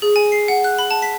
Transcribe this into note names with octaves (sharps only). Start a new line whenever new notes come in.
G#4
G#5
C7
F#5
F#6
B5
A5
B6